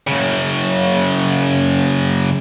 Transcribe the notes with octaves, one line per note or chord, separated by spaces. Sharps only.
F#2 C#3